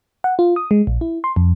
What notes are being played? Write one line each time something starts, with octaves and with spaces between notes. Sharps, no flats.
F#5
F4
D#6
G#3
A#1
E4
C6
F2